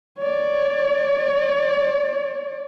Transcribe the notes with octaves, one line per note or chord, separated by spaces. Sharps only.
C#5 D5